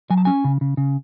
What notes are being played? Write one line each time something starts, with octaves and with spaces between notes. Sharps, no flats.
F#3 G#5
A5
C#4 G#5
C#3
C#3
C#3